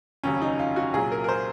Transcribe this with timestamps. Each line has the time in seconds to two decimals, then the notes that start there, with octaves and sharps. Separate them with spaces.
0.24 F1 D#2 C#3 F#3 C#4
0.42 D#4
0.59 F4
0.76 F#4
0.94 C2 A#2 F#3 G#4
1.12 A#4
1.24 A#4
1.29 C5